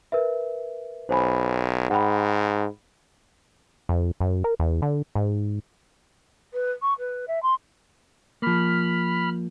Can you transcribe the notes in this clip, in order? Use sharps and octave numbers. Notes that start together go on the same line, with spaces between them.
A#4 B4 E5
B1 C5 G#5 B5
G#2 F#5 G5 B5
F2
F#2
A#4
E2
D3
G#2
B4
C#6
B4
E5
C6
F3 A#3 B5 F6